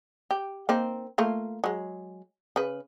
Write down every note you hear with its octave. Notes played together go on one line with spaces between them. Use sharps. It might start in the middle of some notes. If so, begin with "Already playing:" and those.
G4
A#3 C4 D#4
A3 A#3 F4
F#3 G#3
C#3 B4